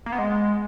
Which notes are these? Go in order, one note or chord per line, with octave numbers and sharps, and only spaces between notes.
A#3
B3
G#3